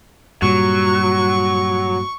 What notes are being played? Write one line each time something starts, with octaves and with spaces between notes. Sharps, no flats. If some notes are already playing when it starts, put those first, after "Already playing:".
G2 A#2 F#3 G3 C#6